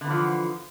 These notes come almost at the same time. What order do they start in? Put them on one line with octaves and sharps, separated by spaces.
D3 B3 E3 F3